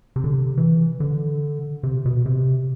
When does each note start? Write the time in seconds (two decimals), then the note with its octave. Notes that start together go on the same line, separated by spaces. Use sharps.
0.16 C3
0.24 D3
0.33 C3
0.58 E3
1.00 D3
1.83 C3
2.05 B2
2.26 C3